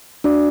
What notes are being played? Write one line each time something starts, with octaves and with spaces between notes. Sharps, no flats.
D4 F#4 D5